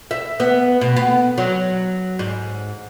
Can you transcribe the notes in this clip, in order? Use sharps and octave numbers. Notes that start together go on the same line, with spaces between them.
E5
B3
B2
B3
F#3
G#2